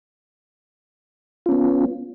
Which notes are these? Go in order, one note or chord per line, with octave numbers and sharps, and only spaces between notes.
B3 C#4 F4